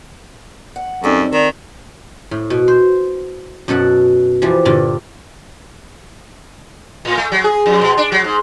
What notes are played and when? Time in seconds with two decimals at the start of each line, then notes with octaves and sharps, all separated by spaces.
0.76 F#5
1.04 F#2 G3 C4 D#4 G4 A4
1.33 D#3 D4
2.31 A2
2.50 B2
2.68 C5
3.68 F#2 B2 A4 F#5
4.42 E3 F3 G3
4.65 G2 A#2 D3
7.05 A2
7.17 A3
7.32 F#3
7.44 G#4
7.66 F2
7.81 B2
7.97 D4
8.12 F#3
8.24 G#2